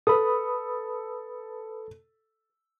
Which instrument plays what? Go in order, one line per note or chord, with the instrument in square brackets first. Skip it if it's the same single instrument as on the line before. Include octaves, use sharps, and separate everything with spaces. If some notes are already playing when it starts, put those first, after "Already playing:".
[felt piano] A4 [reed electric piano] B4 B5 D#6